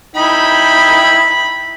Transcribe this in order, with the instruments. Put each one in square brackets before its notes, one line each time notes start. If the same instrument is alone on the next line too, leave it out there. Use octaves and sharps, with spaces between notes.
[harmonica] D#4 E4 G5 [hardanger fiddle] B5